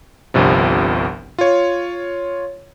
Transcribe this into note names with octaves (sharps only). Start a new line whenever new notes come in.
G1 C2 G2 C3 F3
F4 C#5